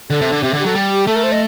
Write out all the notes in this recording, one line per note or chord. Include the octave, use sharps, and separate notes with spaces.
D3 A4
C3
D3
C3 G4
D3 A4
G4
F#3 A4
G3
G4
A3 A4
A#4
C5
D#5